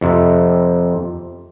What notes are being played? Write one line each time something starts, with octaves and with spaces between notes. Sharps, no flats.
F2 C3